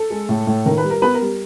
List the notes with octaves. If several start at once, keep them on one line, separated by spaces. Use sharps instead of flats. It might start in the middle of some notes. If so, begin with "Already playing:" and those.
Already playing: A4
G#3
A2
A2
D#3 A#4
B4
G3
A#4
B3 B4
A#4
G3